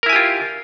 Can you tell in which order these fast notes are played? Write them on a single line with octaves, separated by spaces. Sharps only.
A#4 E4 G#5 G4 F4